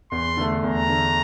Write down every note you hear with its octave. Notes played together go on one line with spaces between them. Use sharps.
E2 C6
D3 A3
E2 A#5
D3 A3